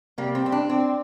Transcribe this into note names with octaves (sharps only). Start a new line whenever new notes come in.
C3 G3 A#3
C4
C4
D4
C4